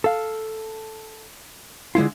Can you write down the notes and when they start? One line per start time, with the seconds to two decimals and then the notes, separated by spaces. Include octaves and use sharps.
0.04 A4 F5
1.95 D3 G#3 E4 F4